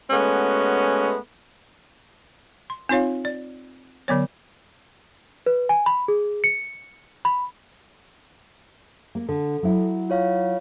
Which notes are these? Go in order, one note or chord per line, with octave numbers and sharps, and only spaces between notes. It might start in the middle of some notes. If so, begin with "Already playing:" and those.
G#3 A3 B3 C#4 F#4
C6
C4 D#4 F4 C#5 F5
D5
D3 F#3 B3 C#5
B4
G#5
B5
G#4
C#7
B5
A#3
D3 A4
F#3 E4
F4 C#5 F5